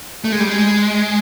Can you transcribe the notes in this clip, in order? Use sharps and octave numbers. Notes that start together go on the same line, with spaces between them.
A3
G#3
G3
G#3